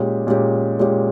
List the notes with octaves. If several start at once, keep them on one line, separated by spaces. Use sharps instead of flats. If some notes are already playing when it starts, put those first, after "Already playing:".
Already playing: A#2 G#3 C#4 G4
A#2 G#3 C#4 G4
A#2 G#3 C#4 G4